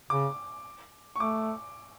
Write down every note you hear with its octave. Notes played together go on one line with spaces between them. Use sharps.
C#3 D6
C#6
A3 D6